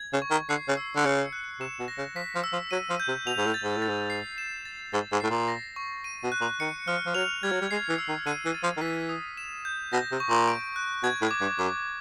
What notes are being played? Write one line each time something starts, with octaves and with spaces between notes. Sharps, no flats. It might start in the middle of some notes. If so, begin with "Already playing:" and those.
Already playing: G#6
C#3
C#6
D#3
D3 C7
C#3
E6
D3
C#3 C#7
F#6
C3 E7
B2
A#6
C#3
F3 B6
F3
E6
F3
F#3 D#7
F3
G6
C3
B2 F7
G#2
A2
A6
G#2
A2
A6
G#2
C7
E7
A6
G#2 A6
G#2
A2 C7
A#2
A#6
C#6
D#7
B2
F#6
A#2
D#3 C#7
F3 F6
F3
F#3 F7
G3 G#6
F#3
G3
G#3 C7
E3
E6
D#3
D3 D#7
E3
A6
F3
D#3
E3 B6
D#6
E7
G6
B2 A#6
C3
C#6
A#2
D7
F#6
B2 G#6
A2
D6
G2
F#2 D6